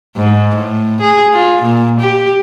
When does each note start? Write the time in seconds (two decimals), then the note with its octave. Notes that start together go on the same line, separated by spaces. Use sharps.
0.17 G#2
0.55 A2
1.01 G#4
1.33 F4
1.62 A#2
2.00 G4